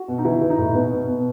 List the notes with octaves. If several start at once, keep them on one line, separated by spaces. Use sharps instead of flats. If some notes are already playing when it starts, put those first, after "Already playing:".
Already playing: F#4
B2
D#4
E3 E4
E3
D#4
A2
B2 B3
B2
B2